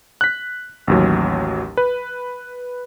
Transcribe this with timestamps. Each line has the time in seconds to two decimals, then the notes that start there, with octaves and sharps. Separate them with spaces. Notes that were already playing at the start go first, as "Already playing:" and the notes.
0.21 F#6 B6
0.87 A1 D#2 F#3
1.77 B4